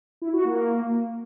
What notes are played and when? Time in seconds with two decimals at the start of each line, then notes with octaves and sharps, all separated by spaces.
0.22 E4
0.33 F#4
0.45 A#3